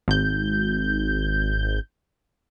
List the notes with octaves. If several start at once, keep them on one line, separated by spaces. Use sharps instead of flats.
G#1 G6